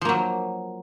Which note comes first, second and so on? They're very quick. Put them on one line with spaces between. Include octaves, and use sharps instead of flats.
F3 A#3 F#3